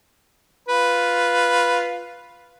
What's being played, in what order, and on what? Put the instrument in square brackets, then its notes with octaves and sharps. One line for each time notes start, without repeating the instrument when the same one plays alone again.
[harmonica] F4 B4